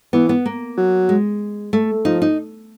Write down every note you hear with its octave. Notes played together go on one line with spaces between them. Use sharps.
E3 B3
B3
A#3
F#3
G#3
A3
F3 D#4
D#4